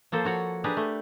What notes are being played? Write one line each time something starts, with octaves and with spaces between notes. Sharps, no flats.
F3 A#3 A4 C5
F3 F#4 C#5 F#5
D4 G4 G#4 B4 A#5
A3